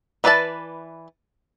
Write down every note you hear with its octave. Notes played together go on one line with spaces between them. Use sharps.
E3 B4 D5 E5 A5